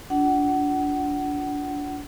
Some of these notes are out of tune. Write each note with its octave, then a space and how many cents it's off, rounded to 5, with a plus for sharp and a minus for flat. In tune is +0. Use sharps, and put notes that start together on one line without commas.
D4 -25 F4 +0 F#5 +25